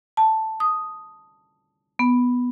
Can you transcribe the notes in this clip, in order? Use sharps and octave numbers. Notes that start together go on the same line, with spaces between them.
A5
D#6
B3